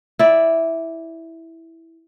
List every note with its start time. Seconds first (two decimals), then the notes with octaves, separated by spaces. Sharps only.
0.19 E4 D5